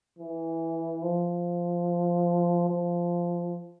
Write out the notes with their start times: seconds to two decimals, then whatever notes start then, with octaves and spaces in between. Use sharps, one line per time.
0.18 E3
1.03 F3
2.69 F3